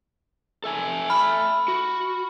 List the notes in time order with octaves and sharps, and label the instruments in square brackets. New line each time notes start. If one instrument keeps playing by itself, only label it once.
[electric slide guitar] A4 E5 G#5
[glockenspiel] B5 F6
[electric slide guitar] F#4